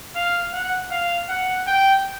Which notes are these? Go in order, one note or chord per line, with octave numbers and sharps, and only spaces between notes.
F5
F#5
F5
F#5
G5